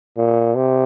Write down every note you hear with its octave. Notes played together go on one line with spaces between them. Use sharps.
A#2
C3